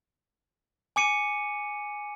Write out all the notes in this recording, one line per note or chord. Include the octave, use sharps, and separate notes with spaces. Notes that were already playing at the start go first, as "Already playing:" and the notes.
G#5 D6 C#7 D#7